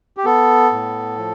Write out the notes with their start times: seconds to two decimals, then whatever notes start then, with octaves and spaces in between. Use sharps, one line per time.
0.17 G4
0.25 B3 A4
0.72 A2
1.18 F3